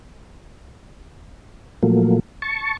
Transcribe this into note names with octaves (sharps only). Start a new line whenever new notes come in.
A#2 F3 F#3 A3 A#3
A5 C#6